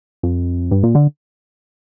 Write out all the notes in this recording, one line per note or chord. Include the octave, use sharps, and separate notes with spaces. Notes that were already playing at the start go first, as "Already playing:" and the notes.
F2
G2
A#2
D3